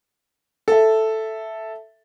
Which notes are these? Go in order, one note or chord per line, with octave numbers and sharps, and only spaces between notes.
A4 E5